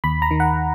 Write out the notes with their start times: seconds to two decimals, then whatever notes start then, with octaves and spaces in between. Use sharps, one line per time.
0.04 D#2 B5
0.22 A#5
0.31 D#3
0.40 F#5